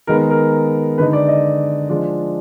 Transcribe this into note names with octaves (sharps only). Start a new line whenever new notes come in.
D#3 G#3 B3 A#4
A#4
D3 G#3 D#4 B4
D5
D#5
F3 G#3 D4 F4